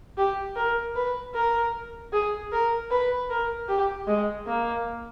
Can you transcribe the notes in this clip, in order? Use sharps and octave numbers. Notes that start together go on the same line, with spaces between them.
G4
A#4
B4
A#4
G#4
A#4
B4
A#4
G4
G#3
A#3